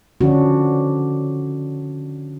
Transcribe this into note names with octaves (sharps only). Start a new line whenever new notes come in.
D3 F3 C#4 D4 F#4